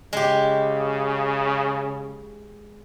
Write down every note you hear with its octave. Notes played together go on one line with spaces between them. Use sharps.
C#3 G#3 G4